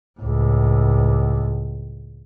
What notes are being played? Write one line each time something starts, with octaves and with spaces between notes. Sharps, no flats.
C#2 A2